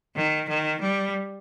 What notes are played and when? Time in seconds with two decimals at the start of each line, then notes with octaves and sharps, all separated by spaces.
0.16 D#3
0.49 D#3
0.81 G3